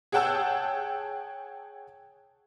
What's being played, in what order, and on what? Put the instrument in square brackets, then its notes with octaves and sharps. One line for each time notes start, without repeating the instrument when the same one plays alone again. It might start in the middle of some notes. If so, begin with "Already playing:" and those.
[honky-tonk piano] G#4 C#5 F#5 G5 A5 E6